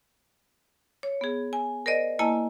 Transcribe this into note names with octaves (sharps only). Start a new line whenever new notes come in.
C#5
B3 G#4
G#5
A#4 C5 D5 D#5
A#3 E4 D#5 G#5 A5